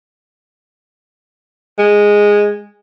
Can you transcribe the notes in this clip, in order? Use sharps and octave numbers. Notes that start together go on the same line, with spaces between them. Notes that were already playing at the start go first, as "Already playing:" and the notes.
G#3